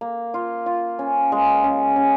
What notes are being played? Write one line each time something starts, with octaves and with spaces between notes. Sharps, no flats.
A#3
F4
F4
C#4
G#3
C#3
C#3